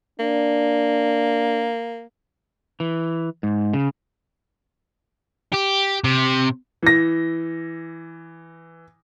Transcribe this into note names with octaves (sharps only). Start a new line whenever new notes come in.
A#3 D4
E3
G#2
C#3
G4
C3
E3 A#6